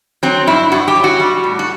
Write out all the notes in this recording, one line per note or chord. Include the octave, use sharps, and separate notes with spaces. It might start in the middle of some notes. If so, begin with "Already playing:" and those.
F#3 C4
G2 E4
G2 F#4
G4
F#3
F#4
G3
A2
F#4